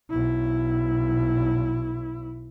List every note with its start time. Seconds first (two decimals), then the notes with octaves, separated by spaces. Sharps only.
0.10 B1 E4